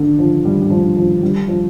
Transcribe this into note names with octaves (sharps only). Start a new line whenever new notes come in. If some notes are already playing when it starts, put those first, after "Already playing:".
Already playing: D3
F3
G3
G3
F3
F3
G3
F3